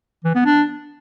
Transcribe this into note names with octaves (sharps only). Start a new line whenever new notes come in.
E3
B3
D4